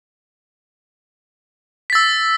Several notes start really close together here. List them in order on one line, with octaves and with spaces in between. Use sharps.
B6 A6 E6